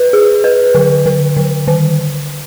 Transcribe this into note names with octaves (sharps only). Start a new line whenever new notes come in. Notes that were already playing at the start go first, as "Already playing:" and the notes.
Already playing: B4
G#4
B4
D3
D3
D3
D#3